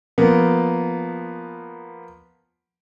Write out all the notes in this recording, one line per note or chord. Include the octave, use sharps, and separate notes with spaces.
F3 A#3 B3